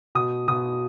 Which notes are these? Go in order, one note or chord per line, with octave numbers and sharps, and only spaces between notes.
B2 D#6
B2 D#6